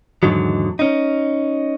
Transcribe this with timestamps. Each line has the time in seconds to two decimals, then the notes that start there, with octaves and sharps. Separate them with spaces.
0.23 E2 G#2 D3 D#3 F#3
0.79 C#4 D#4